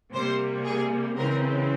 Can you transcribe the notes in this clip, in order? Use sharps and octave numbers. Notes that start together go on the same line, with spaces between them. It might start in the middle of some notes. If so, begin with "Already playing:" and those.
C3 G3 A#3 C5
G#4
C#3 E3 G#3 C4 A#4